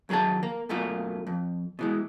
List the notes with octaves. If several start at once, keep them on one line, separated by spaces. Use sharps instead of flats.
D#2 F#3 G#4 C#5 A5
A#3
F#2 B2 A3 A#3 F4
F2
B2 E3 G#3